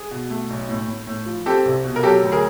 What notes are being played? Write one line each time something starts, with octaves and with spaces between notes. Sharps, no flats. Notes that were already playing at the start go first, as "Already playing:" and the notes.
Already playing: G#4
B2
A3
B1
A2
A2
A2
F3
C4 G4 A4
C2
B2
A#4
F#3 G4 A4
D2
G#4 A#4